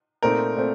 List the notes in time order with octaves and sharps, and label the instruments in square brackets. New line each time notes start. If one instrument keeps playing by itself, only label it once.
[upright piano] A#2 A3 C4 D#4 [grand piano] A#4
[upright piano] A#2 A3 C4